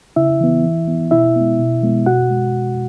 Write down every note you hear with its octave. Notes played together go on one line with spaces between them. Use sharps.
C#3 E4 E5
E3 B3
E3
B3
B2 E4 E5
G#3 B3
B2
G#3 B3
B2 F#4 F#5
G#3